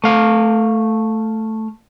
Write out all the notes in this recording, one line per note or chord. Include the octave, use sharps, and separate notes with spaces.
A3 F5